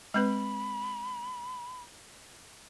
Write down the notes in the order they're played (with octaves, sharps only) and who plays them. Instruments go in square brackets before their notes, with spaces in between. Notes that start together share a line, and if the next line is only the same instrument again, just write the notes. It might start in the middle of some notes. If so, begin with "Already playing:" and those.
[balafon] G#3 C4 B4 [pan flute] B5